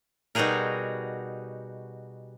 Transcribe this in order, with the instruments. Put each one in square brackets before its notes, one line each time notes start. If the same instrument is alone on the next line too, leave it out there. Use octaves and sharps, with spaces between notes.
[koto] B2 G3 D#4 F#4 G#4 A#4